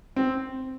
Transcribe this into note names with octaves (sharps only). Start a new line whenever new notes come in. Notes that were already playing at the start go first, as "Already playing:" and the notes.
C4